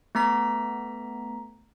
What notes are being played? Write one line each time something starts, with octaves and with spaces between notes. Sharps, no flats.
A3 B3 A#5 B6